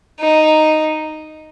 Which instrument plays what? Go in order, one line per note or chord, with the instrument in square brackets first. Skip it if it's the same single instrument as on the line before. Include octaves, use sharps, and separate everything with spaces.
[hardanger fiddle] D#4